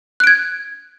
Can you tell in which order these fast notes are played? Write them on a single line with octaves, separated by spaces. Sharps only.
F#6 D7 G#6